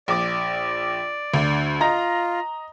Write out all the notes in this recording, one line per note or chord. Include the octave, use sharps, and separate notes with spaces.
A#1 D5 D6
D2 D3
F4 D#5 A#5 A#6